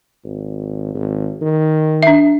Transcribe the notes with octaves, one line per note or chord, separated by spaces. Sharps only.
G#1
G#1
D#3
D4 E5